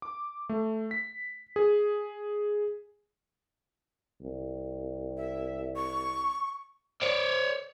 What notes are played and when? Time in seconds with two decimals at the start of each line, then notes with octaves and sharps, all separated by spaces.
0.02 D6
0.49 A3
0.91 B6
1.56 G#4
4.21 C2
5.17 E5
5.76 C#6
7.02 C#5 D5